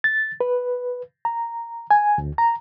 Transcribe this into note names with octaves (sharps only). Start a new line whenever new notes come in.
A6
B4
A#5
G#5
D2
A#5